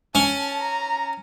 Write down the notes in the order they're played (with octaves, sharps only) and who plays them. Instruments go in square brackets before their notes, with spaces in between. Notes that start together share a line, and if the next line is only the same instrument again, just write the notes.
[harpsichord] C#4 [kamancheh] A5
[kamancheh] A#5